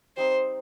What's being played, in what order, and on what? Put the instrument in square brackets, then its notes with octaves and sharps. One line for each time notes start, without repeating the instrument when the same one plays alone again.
[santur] G3 C4 D#4 [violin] C5